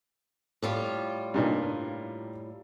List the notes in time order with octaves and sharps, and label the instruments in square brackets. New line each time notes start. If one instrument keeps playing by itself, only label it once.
[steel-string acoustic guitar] A2 G3 F4
[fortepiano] G2 A#2 D#4